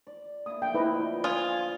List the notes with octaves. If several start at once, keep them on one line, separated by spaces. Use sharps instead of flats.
D5
A#3 E4 D#6
D3 F3 G5
E4 B4 C5 D#5 A#5 B5
F4 G#5 D#6